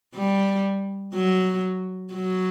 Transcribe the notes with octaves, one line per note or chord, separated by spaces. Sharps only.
G3
F#3
F#3